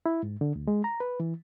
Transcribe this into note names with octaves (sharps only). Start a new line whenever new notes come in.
E4
G#2
D3
D2
G#3
A#5
B4
E3